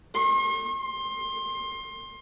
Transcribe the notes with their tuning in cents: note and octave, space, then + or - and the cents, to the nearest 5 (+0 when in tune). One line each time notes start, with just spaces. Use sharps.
C6 +45
C6 +25